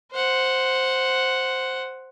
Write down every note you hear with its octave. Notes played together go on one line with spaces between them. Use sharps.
C5 F#5